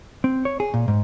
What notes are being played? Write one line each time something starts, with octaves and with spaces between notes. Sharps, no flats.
C4
C#5
G#4
A#2
G#2